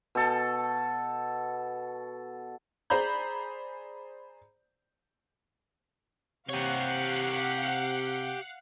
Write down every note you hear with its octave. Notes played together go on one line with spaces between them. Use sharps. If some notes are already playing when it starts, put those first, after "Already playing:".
B2 A4
G#4 C5 D5 A#5 B5 G6
C3 G4 C#5 F5 F#5